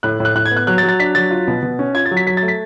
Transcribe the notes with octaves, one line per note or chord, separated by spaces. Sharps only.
A2 F#6
A2
F#6
A2 F#6
G#6
B3
F#6
F#3 F#6
A6
F#3
A6
D4 B6
F#3 A6
F4
B2
B2
C#4
F4 G#6
A6
F#3
B6
F#3 B6
A6
A3
B6